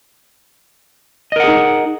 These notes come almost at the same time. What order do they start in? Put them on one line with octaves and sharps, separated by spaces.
D#5 A#4 F#5 G#4 D#4